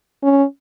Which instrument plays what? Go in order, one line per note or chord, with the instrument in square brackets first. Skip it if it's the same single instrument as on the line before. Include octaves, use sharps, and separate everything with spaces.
[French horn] C#4